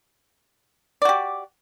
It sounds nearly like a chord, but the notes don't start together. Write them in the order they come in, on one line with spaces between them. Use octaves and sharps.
D5 F#4 G4